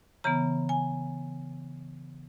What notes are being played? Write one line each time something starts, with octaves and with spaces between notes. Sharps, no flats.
C#3 E3 B3 A#5
G#5